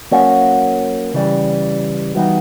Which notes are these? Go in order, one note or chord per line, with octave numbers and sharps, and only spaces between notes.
F#3 A#3 C#4 F#4
C#3 E3 G3
E3 G3 B3 D#4 F#4